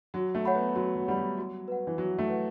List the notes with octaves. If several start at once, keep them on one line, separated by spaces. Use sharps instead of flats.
F#3 F#4
A3
C#5 F#5 B5
B3
F#3 F#4
F#3
G3 C#5 F#5 B5
F#3
F#4
B4 F#5
E3
F#3 F#4
A3
B4 F#5